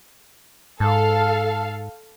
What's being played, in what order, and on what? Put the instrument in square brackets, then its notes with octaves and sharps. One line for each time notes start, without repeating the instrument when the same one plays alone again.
[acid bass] G#2 [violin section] A4 F5